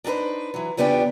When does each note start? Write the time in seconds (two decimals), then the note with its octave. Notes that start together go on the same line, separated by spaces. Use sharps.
0.04 D4 D#4 F#4 B4 C5
0.54 E3 F#3
0.77 E2 C#3 B3 D4 F4 G4